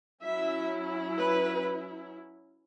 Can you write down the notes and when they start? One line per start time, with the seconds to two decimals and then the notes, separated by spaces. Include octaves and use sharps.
0.24 F#3 C#4 E4 E5
1.19 B4